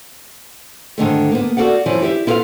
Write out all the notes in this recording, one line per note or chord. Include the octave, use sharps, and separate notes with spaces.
G#2 D3 D#3 A3
A#3 B3
F#4 A4 D5 F5 F#5
F#2 E3 F3
E4 G4 C5 E5
E4 F4 A4 B4 F5